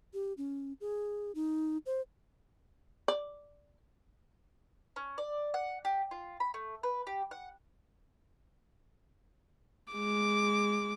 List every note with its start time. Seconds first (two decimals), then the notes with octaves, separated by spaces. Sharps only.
0.14 G4
0.37 C#4
0.81 G#4
1.35 D#4
1.86 C5
3.08 D5
4.96 C#4
5.18 D5
5.54 F#5
5.85 G4
6.11 F4
6.40 B5
6.54 A3
6.83 B4
7.07 G4
7.31 F#5
9.93 G#3 D6